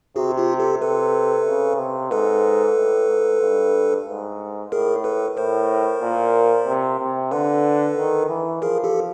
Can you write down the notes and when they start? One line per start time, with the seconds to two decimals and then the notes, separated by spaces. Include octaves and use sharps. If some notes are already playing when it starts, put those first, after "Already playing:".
0.16 C3 F#4 G#4
0.37 F4 G4
0.60 G4 A4
0.81 C3 A4 B4
1.47 C#3
1.79 C3
2.11 G#2 A4 B4
2.76 A2
3.09 G#2
3.42 G2
4.07 G#2
4.72 A2 G#4 A#4
5.04 A4 B4
5.36 A2 A#4 C5
6.02 A#2
6.67 C3
7.00 C3
7.31 D3 A4 B4
7.97 D#3
8.29 E3
8.62 F3 G#4 A#4
8.84 G4 A4